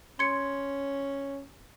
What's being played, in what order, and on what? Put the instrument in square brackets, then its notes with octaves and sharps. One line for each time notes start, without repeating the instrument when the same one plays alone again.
[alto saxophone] C#4 [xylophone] C6 G#6 C#7